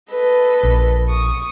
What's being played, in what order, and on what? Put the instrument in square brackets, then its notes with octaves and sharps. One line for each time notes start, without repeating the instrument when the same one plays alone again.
[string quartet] A4 B4 D#5
[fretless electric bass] A#1
[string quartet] C#6 D#6